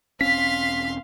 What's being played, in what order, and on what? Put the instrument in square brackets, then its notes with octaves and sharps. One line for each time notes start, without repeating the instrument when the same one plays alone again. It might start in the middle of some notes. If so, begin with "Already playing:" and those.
[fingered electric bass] E1 C4 C#4 [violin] F5 C6 [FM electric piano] B6